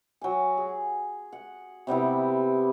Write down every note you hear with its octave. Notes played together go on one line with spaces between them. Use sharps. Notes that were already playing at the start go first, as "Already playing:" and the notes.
F#3 G#5
G#4
F#5
C3 G3 B3 E4